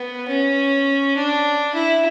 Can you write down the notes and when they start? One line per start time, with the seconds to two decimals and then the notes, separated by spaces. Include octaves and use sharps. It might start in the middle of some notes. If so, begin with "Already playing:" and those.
Already playing: B3
0.28 C#4
1.16 D4
1.74 E4